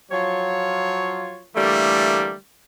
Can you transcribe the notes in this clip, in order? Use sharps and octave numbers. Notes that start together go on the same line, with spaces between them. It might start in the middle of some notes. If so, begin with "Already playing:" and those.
F3 F#3 F4 C#5
D3 E3 G3 A3 A#3